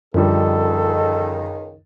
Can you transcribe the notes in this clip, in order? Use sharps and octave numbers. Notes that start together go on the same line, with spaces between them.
C#2 F#2 D3 D#3 F3 G3 A4